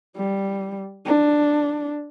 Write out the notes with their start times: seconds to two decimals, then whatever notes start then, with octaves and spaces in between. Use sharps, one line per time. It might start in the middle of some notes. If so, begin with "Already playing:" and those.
0.17 G3
1.06 D4